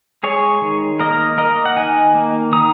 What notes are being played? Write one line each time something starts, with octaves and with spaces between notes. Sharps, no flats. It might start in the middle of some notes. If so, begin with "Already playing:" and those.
G#3 G#4 C#5
D#3
A#3 A#4 D#5
A#3 A#4 D#5
F#5
D#3 D#5 G#5
A#3
D#3 A#5 D#6